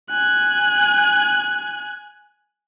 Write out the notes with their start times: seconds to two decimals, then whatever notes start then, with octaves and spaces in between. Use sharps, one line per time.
0.10 G#5 F#6